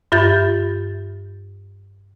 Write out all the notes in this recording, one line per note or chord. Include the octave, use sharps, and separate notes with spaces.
G2 F4 E5 B5 G6 A6